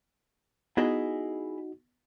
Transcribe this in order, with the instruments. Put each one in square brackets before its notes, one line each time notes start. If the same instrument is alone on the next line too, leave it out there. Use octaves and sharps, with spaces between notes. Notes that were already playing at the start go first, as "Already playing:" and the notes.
[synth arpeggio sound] B3 [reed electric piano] D#4 F#4 [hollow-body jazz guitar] E4 G#4 D#5